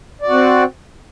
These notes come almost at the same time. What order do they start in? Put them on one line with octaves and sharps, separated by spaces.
D5 F#4 C4